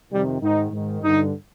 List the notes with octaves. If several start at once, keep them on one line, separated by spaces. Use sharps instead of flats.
F2 C3 D#3 G3
G#2 D#3 D#4
G#2 D#3
G2 D3 D#4